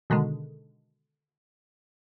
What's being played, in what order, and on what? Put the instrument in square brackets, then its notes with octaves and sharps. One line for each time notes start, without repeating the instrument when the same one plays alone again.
[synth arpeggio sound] B2 D3 D#3 G#3